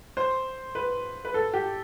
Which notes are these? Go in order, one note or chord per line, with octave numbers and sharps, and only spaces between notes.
C5
B4
B4
A4
G4